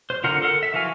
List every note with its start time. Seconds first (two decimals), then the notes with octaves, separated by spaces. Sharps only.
0.10 C5
0.24 D3 F4 A#4 F#5
0.42 A4 A#4 F#5
0.63 E5
0.74 E3 F3 F#4 F5 G#5